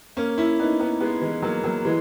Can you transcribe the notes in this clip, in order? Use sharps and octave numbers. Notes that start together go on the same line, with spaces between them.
A#3 C#4
C#4 E4
B3 D#4
B3 D#4
G#3 B3
E3 G#3
F#3 A#3
F#3 A#3
E3 G#3